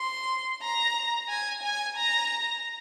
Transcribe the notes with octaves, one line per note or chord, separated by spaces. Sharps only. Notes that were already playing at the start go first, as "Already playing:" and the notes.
Already playing: C6
A#5
G#5
G#5
A#5